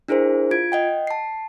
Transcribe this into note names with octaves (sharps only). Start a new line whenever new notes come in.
D4 E4 G#4 A#4 C5
F4 G#6 D7
D#5 F#5 G5
A5 C7